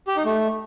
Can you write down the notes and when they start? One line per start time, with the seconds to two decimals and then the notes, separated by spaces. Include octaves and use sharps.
0.08 G4
0.16 D#4
0.25 A3